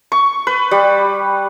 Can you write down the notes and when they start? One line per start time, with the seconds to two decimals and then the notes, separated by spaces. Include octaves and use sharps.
0.12 C#6
0.47 B4
0.71 G3